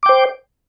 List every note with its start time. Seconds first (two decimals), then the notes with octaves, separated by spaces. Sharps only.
0.03 D6
0.06 G5
0.09 C5